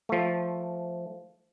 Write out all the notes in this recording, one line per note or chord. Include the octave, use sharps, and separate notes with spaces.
F3 A3